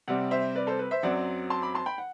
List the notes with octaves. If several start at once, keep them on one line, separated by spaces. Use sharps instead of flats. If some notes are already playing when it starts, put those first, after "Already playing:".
C3 G3 C4 D5 F#5
C5 E5
B4 D5
A4 C5
B4
C5 E5
F#2 F#3 C4 D5 F#5
A5 C6
B5 D6
A5 C6
G5 B5
F#5